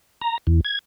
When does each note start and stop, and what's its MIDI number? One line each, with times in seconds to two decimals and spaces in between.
0.22 0.38 82
0.47 0.61 40
0.65 0.79 92